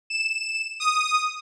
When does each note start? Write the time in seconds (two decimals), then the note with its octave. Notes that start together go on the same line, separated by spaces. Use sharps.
0.10 E7
0.80 D#6